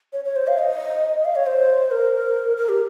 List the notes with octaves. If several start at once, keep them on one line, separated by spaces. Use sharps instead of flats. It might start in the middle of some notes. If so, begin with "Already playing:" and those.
C#5
C#5
C5
F5
D#5
F5
C#5
C5
A#4
A#4
G4